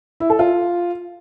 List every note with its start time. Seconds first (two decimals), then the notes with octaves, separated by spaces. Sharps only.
0.20 E4
0.30 A4
0.39 F4